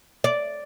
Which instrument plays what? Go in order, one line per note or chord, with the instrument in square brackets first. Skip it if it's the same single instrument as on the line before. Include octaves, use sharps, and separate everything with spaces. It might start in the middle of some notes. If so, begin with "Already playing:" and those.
[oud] D5